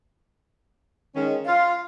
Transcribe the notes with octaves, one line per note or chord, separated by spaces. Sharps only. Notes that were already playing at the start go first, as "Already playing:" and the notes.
D#3 G#3 C#4
F4 F5